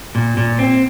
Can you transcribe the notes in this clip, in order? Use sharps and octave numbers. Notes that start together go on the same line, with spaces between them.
A#2
A#2
C4